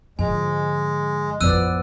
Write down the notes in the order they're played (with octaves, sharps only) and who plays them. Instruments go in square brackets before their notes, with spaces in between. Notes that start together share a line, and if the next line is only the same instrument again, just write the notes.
[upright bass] G#2 D3 [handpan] F3 [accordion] G#3 [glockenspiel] G#5
[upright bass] A1 F2 [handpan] F3 B3 D5 [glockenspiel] E6 F#6 D#7